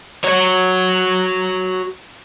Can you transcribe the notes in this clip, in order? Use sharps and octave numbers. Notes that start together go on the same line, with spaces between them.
F#4 C#5